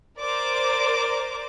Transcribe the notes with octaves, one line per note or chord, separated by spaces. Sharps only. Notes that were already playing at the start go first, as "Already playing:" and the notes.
A#4 C5 D5 D6